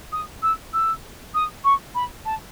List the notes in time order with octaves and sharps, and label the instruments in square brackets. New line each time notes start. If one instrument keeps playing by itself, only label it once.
[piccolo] D#6
E6
E6
D#6
C#6
B5
A5